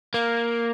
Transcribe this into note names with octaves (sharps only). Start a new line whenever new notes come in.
A#3